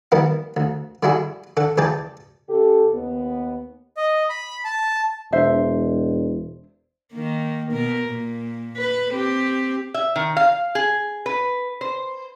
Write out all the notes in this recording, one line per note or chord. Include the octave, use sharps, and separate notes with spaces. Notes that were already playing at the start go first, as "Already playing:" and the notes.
D#3 E3 G3 A#3 B3 E4
D2
D3 G3 D4 E4 F#4 G#4
D3 A4 F#5
C#2 E3 G#4 D5 G5 A5
C#3 G4 A4
D#2 B3
D#5
B5
A5
E1 D4 C5 E5
D#3 A#3
B2 A#4
A#2
B4
C4 G4
E5
D#3
F5
G#4
B4
C5